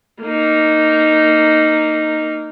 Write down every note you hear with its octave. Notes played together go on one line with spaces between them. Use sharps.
A#3 D#4